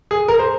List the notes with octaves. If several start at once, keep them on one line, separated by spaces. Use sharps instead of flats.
G#4
A#4
C5